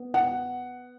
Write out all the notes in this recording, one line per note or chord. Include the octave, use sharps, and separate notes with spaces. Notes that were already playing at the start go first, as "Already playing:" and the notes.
Already playing: B3
F#5